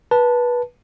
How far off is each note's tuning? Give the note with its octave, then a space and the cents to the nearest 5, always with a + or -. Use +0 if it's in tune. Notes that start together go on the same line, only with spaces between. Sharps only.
B4 -20 A5 +0